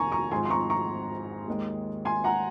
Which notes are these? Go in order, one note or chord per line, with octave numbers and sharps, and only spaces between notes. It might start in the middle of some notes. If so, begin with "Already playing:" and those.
Already playing: F1 D#2 D#3 G#5 A#5 C#6
A#5 C#6
G#1 G#2 F3 G#5 C6
C6
A#5 C#6
A#5 C#6
D#2 D#3 G#3
G#5 C6
F#5 A#5